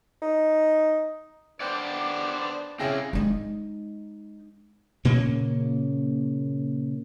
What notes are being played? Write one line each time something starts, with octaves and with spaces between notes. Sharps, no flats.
D#4
B3 D4 C5 D5 F#5 G5 D6
C#3 C4 E4 G#4 G5 A#6
G#3 D#4
A#2 C#3 A#3 C#4